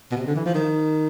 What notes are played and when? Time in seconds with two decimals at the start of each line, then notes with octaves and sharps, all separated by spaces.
0.11 B2
0.17 C3
0.26 D3
0.36 E3
0.45 F3
0.55 D#3